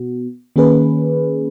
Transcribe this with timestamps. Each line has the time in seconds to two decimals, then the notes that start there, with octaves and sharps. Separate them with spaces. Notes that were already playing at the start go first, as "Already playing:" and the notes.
Already playing: B2 B3 F#4
0.56 D#3 A#3 C#4 G#4 B4